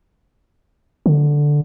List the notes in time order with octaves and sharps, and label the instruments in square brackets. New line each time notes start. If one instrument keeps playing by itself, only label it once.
[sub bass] D3